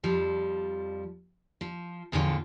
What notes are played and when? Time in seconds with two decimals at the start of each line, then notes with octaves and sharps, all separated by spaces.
0.04 F2 F3 G3
1.61 F3
2.12 E2 A2 D3 F3 F4 C#5